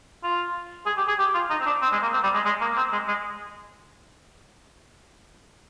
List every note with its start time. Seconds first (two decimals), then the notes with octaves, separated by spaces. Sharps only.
0.23 F4
0.86 G#4
0.97 G4
1.08 G#4
1.19 G4
1.34 F4
1.50 D#4
1.60 C4
1.66 D4
1.82 C4
1.92 G#3
2.02 A#3
2.13 C4
2.23 G3
2.34 G#3
2.45 G#3
2.61 A#3
2.77 C4
2.92 G#3
3.08 G#3